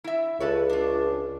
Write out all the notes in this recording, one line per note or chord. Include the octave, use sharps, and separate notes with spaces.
E4 E5
C#2 A4 B4 C#5
D4 F4